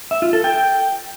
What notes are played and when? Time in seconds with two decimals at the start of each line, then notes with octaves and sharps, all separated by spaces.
0.11 E5
0.22 F4
0.33 A4
0.44 G5